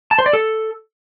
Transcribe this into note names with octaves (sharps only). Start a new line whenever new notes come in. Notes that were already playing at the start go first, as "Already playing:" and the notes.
A5
C5
D5
A4